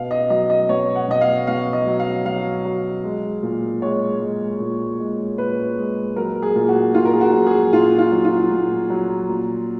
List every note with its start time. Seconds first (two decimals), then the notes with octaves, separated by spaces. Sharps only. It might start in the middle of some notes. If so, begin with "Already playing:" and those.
Already playing: B2 F5
0.11 D#5
0.30 F#3 D#5
0.50 D#5
0.69 B2 C#5
0.95 F#5
1.08 B2 D#5
1.21 F5
1.47 B2 F5
1.73 D#5
1.87 F#3
1.99 F5
2.25 F#3 F5
2.65 F#3
3.04 G#3
3.43 A#2
3.82 G#3 C#5
4.21 G#3
4.60 A#2
4.99 G#3
5.38 A#2 B4
5.77 G#3
6.16 F#3 A#4
6.42 G#4
6.56 A#2
6.69 F#4
6.94 A#2 F4
7.05 A#4
7.13 G#4
7.21 F#4
7.33 F#3
7.47 G#4
7.73 A#2 F4
7.98 F4
8.12 F#3
8.25 F4
8.51 A#2
8.90 F#3
9.29 A#2